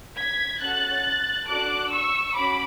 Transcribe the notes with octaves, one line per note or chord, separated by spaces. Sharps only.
G#6 B6
C#4 F#4 A4 F#6 A6
D4 F#4 A4 D6 F#6
C#6 E6
C#4 F#4 B5 D6